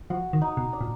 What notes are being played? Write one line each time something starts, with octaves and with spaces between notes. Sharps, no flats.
F3 F#4
D#3
D#4
B2
D4
A#2